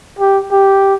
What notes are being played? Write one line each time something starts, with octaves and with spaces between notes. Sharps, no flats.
G4
G4